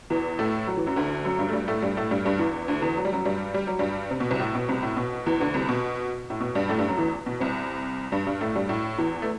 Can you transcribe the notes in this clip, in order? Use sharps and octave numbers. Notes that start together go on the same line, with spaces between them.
E2 E3
A2 A3
F#3
E3
F#2 F#3
D2 D3
F#2 F#3
G2 G3
A3
G2 G3
A2 A3
G2 G3
A2 A3
G2 G3
G2 G3
E2 E3
D2 D3
E2 E3
F#3
G3
F#2 F#3
G2 G3
G3
F#3
G2 G3
C3
B2
C2 C3
A2
B2
C2 C3
A2
B2
E2 E3
D2 D3
C2 C3
B2
A2
B2
G2 G3
A2 A3
G2 G3
F#2 F#3
E2 E3
B2
C2 C3
G2 G3
G2 G3
A2 A3
G2 G3
A2
E2 E3
A3